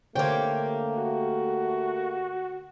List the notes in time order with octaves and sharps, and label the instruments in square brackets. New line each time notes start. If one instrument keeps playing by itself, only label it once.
[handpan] D3 C5 C#5 [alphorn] A3 [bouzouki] A#3 G4
[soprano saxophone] F#4